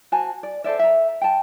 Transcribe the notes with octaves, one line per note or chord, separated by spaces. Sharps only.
F#4 C5 G#5 A5
D5
A4 C5 D5 E5
E5 A#5
G5 A5